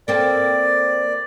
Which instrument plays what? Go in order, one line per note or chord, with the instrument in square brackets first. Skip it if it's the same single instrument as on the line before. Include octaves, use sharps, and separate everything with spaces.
[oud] A#3 C4 A4 [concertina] D5